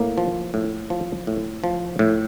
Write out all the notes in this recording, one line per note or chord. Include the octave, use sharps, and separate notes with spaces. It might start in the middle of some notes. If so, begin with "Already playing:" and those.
Already playing: A2 A#3
F3
A2
F3
A2
F3
A2